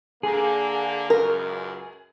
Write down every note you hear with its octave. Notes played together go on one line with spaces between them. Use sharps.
D3 A#3 G#4
C#2 F#2 A#4